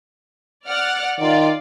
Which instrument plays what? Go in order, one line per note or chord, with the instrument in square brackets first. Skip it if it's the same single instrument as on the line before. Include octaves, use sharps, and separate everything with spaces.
[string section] D5 F#5 F6
[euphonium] D#3 [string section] F4 D5